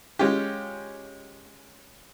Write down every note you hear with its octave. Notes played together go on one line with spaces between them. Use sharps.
G#3 C#4 F4 G4